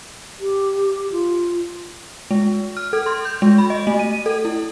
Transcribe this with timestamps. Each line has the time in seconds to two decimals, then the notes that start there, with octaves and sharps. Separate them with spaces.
0.40 G4
1.12 F4
2.31 G#3
2.77 F6
2.93 A4
3.06 C6
3.25 G6
3.42 G#3
3.58 B5
3.70 D#5
3.87 A3
3.99 D#7
4.26 A4
4.45 E4